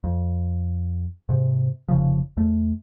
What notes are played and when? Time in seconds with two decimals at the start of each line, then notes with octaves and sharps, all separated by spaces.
0.04 F2
1.29 G#2 C3
1.88 F1 C#3 F3
2.37 E2 A3